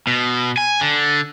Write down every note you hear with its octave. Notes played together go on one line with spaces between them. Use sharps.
B2
G#5
D3